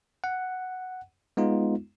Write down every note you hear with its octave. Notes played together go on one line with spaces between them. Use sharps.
F#5
G#3 B3 D#4 F4